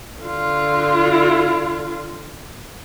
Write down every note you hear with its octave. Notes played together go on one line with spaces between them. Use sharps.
D3 F4